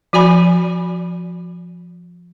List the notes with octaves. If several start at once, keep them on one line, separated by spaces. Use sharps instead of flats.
F3 F#4 D5 G#5 B5